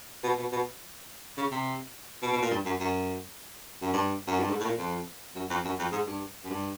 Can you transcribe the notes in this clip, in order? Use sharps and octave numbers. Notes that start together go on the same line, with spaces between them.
B2
B2
B2
C#3
C3
B2
B2
A#2
G2
F#2
F#2
F#2
G2
F#2
G2
G#2
A2
A#2
F2
F#2
F2
F#2
F2
G#2
G2
F#2
G2